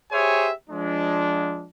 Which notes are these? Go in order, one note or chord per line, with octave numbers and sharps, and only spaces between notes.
G4 G#4 C5 C#5 E5 G#5
F3 G#3 D4